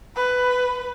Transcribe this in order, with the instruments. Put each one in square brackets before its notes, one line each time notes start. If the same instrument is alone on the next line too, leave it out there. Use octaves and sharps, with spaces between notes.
[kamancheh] B4 [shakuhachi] B5